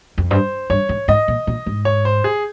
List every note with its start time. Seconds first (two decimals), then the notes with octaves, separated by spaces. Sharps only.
0.18 F2
0.31 G2 C5
0.70 G2 C#5
0.89 G#2
1.08 G#2 D#5
1.28 A#2
1.47 A#2
1.66 G#2
1.85 C#5
2.05 C5
2.24 G#4